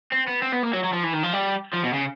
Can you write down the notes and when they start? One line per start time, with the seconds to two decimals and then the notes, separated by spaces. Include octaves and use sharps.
0.12 C4
0.28 B3
0.42 C4
0.53 B3
0.63 A#3
0.73 F#3
0.83 F#3
0.93 F3
1.03 E3
1.13 D#3
1.23 F3
1.33 G3
1.73 F3
1.84 B2
1.93 C#3